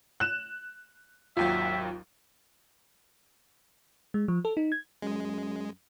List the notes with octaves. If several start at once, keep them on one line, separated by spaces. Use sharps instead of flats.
F#6 E7
G#1 D#2 F#3 F4 E5 G5
G#3
F3
A4
D#4
G#6
F#2 G#3